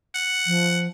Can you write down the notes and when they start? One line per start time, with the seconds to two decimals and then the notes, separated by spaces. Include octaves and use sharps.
0.15 F#5
0.47 F3